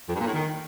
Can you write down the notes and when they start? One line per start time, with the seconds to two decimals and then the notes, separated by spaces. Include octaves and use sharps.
0.08 F2
0.14 G2
0.20 A#2
0.26 A2
0.33 D#3